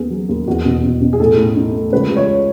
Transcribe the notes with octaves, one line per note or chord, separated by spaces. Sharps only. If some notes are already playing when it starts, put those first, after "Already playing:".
Already playing: D#2 B3 G#4
F#3
D#2
E2 F#4
B2
B2
B2
G#4
A2 A4
A2
D#4
A3
C#2 B4
C#2
C#5